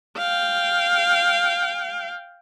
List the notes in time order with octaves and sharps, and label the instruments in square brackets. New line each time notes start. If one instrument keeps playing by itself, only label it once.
[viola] F5 G5